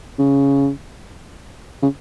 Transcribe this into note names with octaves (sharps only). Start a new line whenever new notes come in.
C#3
C#3